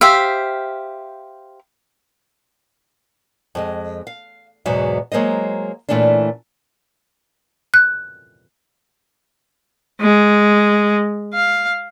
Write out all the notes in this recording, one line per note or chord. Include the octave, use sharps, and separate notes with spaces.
G4 C5 E5 F5
F2 G#3 D#5
F5
E2 G#2 B2 F#3 E5
F#3 G#3 A#3 C5 D#5
A#2 E3 A3 C#4 D4
F#6
G#3
F5